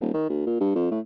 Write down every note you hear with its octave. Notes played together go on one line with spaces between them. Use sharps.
D#1
D#3
D2
A#2
G2
F2
A2